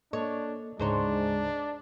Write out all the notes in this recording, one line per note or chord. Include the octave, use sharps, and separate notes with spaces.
A#3 D4 A4 C#5 D#5
D2 G#2 C#3 G#3 D4 C5 C#5 A#5